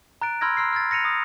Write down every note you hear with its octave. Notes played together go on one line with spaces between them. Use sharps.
A#5 F#6 A6 D7
B5 C6 E6 F6 G#6 A#6
A#5 C6 E6 F6 C7
F6 G#6 A6
A#6 C#7 D#7 F7
D#6